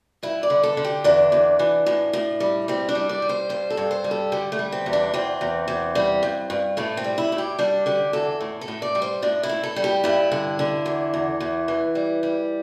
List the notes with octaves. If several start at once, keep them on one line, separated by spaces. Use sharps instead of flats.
G2 E4
D5
D3
A4
D3
G4
E2 D4
E2
E3
A2
A2
G3
G3 C4
D4
G3
D5
G3
C5
G2 C5
A4
G2
C5
G3
A4
D3 G4
A3
G3
C4
E2
D4
E2 C4
E2
E2
G3
G2
G2
A2 A3
C4
G3
E4
A2
G4
G3 D4
D3 G4
E2 A4
A2
A4
A2
D5
G3
C5
A2 D4
E4
A2
A4
G3
G4
G2 E4
D3
D3
E2
E2
E2
E3
G3
G3